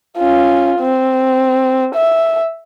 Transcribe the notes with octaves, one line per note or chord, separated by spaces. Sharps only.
C#4 F4
C4
E5